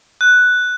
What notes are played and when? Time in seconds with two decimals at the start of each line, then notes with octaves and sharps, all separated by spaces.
0.21 F#6